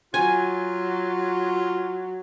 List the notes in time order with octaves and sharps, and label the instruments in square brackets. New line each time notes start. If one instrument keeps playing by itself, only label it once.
[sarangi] F#3 [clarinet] F4 [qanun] G#5